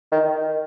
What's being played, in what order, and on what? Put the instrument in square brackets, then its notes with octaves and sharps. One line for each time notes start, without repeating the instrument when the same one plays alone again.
[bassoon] D#3